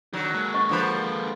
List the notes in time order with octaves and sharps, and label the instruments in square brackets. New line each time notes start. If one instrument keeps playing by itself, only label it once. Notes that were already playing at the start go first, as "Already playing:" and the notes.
[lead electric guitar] D#3 D4 [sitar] F#3
[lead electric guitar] G#3 A#3
[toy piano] D#5 C#6
[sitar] D3 F3 B4